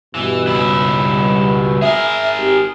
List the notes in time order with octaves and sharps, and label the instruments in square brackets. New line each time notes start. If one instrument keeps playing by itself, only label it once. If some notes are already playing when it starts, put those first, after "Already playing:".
[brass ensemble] G2 B2 [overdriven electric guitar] E3
[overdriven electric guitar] C#2 E4
[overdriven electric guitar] G#4 A#4 [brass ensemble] E5
[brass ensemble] G#1 G4